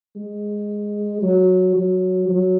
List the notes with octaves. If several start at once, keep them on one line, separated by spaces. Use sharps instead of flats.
G#3
F#3
F#3
F#3